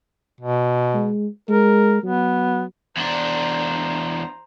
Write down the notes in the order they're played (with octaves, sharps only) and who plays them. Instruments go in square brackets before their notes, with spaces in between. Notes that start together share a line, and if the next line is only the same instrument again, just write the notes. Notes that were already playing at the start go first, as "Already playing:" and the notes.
[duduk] B2
[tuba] G#3
[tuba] G#3 [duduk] A#4
[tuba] F#3 [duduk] B3
[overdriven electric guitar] E2 D4 [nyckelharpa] C5 A#5